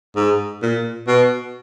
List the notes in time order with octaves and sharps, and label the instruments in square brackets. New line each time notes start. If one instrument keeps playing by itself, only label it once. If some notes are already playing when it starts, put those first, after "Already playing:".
[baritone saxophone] G#2
A#2
B2